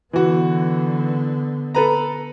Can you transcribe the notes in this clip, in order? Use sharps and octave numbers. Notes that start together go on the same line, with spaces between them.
D3 E3 B3 F#4
A4 B4 A#5